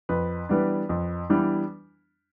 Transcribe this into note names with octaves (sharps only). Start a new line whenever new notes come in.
F2 B4
E3 G3 B3 D4
F2
E3 G3 B3 D4